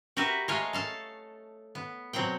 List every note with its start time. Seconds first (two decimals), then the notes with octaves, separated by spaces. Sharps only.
0.17 F#4 G4 A#4 B4 E5
0.48 G#3 A3 A#4 C#5 D#5 F5
0.73 A4 F5 A5
1.75 B3
2.13 B2 F#3 C4 F#5 G5